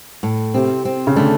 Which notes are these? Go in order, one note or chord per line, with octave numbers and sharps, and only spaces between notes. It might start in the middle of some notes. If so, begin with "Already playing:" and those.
A2
C3 C4
C4
C#3
D3 A3